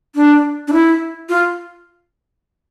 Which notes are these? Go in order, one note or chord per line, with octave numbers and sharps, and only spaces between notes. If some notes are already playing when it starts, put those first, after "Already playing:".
D4
D4
E4
F4